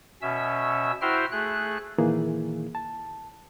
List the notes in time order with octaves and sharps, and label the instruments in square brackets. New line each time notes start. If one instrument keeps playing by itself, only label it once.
[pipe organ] B2 C#4 E5 E6
E4 F#4 C5 E5 G5 F6
A3 G#4 F#6
[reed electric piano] A#2 D#3 E3 A#3 E4 G#4
A5